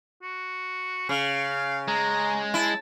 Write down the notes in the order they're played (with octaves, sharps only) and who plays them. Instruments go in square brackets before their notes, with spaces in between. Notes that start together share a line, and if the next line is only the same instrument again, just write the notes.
[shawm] F#4
[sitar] C#3 [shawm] F5
[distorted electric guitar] G#3 [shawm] A#5
[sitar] E4 [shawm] A5